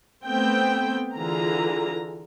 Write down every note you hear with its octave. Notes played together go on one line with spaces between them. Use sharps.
A3 B3 C4 G5
D3 E3 F4 G#4 A#5